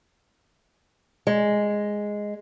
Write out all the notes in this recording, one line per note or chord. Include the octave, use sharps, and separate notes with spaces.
G#3